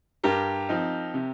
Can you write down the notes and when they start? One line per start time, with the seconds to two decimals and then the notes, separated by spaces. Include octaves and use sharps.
0.23 G2 G4 A#4
0.69 F3 C4 D#4
1.14 C3